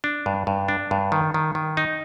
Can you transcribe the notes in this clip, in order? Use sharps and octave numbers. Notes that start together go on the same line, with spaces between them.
D4
G2
G2
D4
G2
D#3
D#3
D#3
D#4